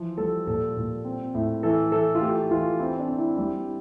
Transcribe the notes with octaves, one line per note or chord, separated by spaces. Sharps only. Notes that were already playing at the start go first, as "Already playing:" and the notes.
Already playing: E3 F3
G3 A4
A#2 A4
A#2
C4
A2
E3 A4
E3 A4
F4
A3 G4
E3 F4
C4 E4
D4
C4
E4
G3 E4